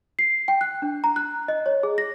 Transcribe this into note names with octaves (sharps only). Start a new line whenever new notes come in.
C7
G5
F#6
D4
A#5
F#6
D#5
C#5
G#4
A#6